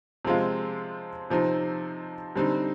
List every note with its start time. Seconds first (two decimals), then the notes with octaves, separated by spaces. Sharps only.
0.25 C3 F3 G#3 C4 F4
1.30 C3 F3 C4 D#4
2.36 D3 G3 C4 D#4